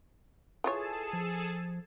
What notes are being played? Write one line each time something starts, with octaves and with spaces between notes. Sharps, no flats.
E3 F4 G#4 A4 C#5 A5
F3